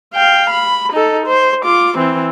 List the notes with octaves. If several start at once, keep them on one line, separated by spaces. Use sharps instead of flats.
F5 G5
B5
D#4 A4
C5
F4 D6
E3 C4